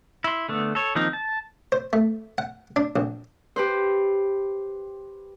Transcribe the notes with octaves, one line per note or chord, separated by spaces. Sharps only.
E4 C6
D3 A3 B3
A4 C#5
D#3 F3 A#3 C4 D#4
A5
C5
A3
F#5
D4
A#1
G4 B4 C5